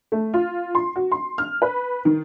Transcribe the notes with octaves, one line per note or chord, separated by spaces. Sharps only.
A3
F4
C6
F#4
C6
F6
B4
D#3